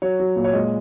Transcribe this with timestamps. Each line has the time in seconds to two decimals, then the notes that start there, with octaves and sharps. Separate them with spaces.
0.02 F#3 C#5
0.20 F#3
0.36 A#2
0.44 C#5
0.53 G#3 D#5